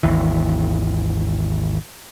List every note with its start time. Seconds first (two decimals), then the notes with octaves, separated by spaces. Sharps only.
0.03 G#1 D#2 E3